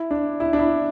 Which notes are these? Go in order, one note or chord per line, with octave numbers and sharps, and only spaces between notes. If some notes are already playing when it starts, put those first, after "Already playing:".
Already playing: E4
D4
E4
D4
E4